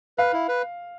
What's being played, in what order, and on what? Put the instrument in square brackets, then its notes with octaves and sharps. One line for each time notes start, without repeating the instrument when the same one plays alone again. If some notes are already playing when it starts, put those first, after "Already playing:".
[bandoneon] B4 [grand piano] F5
[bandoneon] E4
B4